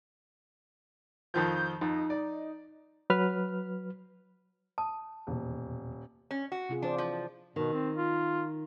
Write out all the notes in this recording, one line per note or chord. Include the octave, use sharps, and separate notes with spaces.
F2 D#3 F3 G6
F2 D#4
D5
F#3 B4 F6
A5 D#6
D#1 E2 B2
C#4
F#4
C3 F4 G#4
E3 D4 C5 D5
F3
B2 D#3
C4
F4